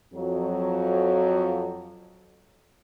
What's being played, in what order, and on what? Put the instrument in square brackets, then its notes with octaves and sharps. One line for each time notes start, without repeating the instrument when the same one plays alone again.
[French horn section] F2 F#3